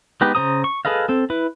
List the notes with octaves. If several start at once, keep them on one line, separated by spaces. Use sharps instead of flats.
G#3 B3 D#4 G4 B4
C#3 C#4 C5 A#5 D#6
C#6
G#4 A4 B4 D#5 F5
C4 A4
E4 B4